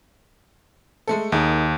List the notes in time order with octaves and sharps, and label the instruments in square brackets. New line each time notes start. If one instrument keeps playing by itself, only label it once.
[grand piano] G#3 A3 A4
[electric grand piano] D#2 [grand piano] D#4 G#4 A#4